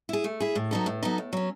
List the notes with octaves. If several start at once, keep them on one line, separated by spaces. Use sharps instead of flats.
E4 G#4
A3
E4 G#4
A2
F#3 B3 D#4 A4
A2
F#3 B3 D#4 A4
A2
F#3 C#4